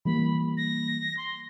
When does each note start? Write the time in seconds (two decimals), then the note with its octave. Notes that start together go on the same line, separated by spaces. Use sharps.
0.05 E3 G3 A#3 B5
0.57 A#6
1.17 C6